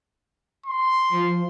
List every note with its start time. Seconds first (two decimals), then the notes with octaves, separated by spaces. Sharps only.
0.66 C6
1.12 F3